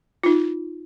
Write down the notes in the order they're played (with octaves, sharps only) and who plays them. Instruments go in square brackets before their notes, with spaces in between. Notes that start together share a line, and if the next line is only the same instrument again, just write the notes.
[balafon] D#4 F4